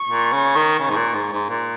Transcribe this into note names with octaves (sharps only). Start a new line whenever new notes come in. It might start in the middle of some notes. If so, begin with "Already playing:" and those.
Already playing: C#6
A#2
C#3
D#3
C#3
G#2
A#2
G#2
G#2
A#2